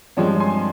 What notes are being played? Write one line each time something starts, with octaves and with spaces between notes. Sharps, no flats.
G2 F3 G#3 C4 C#5
G#5 C6